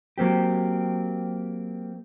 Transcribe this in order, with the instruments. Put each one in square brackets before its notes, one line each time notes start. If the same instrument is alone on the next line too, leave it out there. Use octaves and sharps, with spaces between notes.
[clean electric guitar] F#3 A#3 C4 G4